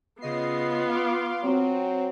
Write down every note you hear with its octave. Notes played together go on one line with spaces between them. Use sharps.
C#3 B3 F4 D#5 C7
F5 C6 D6
F#3 C4